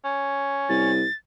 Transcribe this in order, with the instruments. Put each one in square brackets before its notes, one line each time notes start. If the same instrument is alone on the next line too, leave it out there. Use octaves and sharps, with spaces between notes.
[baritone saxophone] C#4
[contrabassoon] C2 [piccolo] A6